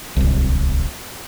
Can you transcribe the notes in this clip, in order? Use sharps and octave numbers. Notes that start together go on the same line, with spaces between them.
D1 C2